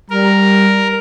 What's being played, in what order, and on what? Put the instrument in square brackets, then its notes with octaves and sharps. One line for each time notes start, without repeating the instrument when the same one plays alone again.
[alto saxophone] G3 [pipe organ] A#4